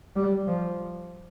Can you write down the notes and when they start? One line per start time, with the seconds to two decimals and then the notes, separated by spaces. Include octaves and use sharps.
0.16 G3
0.47 F3